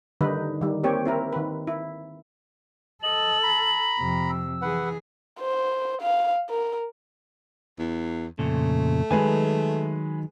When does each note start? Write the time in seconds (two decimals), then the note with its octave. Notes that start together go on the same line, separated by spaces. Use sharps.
0.21 D3 D#3 G3 D#4 B4
0.61 D#3 G3
0.83 A#3 C4 G4 C#5
1.06 C4 E4 A#4
1.33 D#3 B4
1.67 E4
3.03 A4 D#5 F#7
3.43 A#5 B5
3.99 F2 C3
4.30 E6
4.62 E3 G#4 B4 F#5
5.40 C5
6.01 F5
6.50 A#4
7.79 E2
8.39 F2 A#2 C#3 A3
9.11 D#3 F#3 G#3 B4 G#5